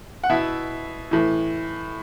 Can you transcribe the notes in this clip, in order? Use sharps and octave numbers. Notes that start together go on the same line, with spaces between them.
F#5
B2 E4 E5
A2 E3